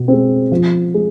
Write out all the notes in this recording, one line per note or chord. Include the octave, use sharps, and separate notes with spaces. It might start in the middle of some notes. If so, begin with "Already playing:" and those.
Already playing: B2
G#3 C4
F3
G#3